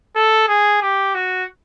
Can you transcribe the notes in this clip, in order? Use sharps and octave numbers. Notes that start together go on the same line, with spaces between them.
A4
G#4
G4
F#4